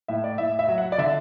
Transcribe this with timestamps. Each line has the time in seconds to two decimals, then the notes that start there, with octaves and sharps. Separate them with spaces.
0.08 A2 E5
0.24 D5
0.38 A2 E5
0.59 E5
0.68 F#3
0.78 F#5
0.92 D5
0.98 D3 E5